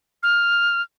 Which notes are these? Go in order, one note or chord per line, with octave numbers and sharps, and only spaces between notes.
F6